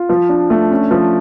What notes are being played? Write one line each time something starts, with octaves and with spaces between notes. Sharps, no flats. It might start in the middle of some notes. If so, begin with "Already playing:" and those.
Already playing: F4
F3
D4
A3
C#4
F3